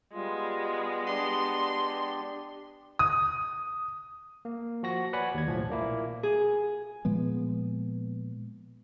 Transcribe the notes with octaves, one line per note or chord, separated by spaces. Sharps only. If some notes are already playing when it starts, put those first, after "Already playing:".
G3 G#3 B3 F4
D4 G4 D5 C6
D#6
A#3
F3 F#4 A#6
B4 C#5 D5 F#5 G#5 B5
D#2 G#6
B1 A2 F3
A#2 A#3 E4
G#4
A#2 F3 G#3 B3